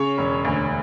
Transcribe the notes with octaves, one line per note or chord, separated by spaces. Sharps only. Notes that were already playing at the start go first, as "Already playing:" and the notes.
Already playing: C#3 C#5
E1
D2